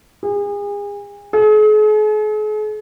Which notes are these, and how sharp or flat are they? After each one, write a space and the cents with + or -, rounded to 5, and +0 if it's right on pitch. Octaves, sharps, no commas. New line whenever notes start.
G#4 -35
G#4 +45